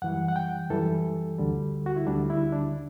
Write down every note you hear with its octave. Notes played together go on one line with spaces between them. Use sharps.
F#2 E3 G3 F#5
F#5
G5
F#2 E3 G3 A4
D2 D3 G3
F#4
E4
D2 D3 G3 D4
E4
D4